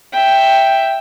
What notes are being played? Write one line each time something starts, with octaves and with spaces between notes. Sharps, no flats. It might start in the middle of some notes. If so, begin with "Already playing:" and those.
E5 G5